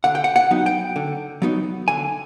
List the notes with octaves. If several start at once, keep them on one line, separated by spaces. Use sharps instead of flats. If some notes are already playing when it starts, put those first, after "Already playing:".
D3 F#5
G5
F#5
F#5
F#3 B3 D#4
G5
D3
F#3 B3 D#4
D3 G#5